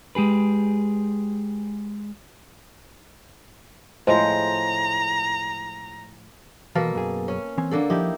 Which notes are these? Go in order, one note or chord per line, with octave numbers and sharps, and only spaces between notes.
G#3 G4 G#4 B4
A2 F3 G#3 C5 A#5
B2 E3 A#3 A4 F5 A5
F#2 G#4
C#4
E3 C4 G#5
D3 A#3 A4
F3 D#4 E4 G4